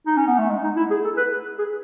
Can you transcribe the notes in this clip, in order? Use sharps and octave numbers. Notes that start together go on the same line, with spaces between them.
D#4
C#4
B3
A3
G#3
D#4
E4
G#4
A4
B4
G#4